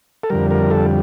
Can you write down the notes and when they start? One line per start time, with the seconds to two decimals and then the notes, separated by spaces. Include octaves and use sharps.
0.23 A4
0.30 F2 D3 G3 A#4
0.51 A#4
0.70 A4